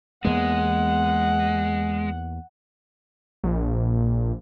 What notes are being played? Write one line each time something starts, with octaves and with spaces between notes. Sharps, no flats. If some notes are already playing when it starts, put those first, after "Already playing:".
E2 G#3 A#3 B3 F#5
A#1